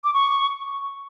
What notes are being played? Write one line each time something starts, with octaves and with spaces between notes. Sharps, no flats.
D6
C#6